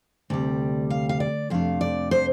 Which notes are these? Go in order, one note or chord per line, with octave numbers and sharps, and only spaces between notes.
D2 C3 G3 D5
F5
F5
D5
F2 C3 A3 D4 F5
D5
C5